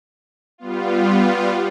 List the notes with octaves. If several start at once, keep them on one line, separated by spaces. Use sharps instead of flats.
G3 B3 F4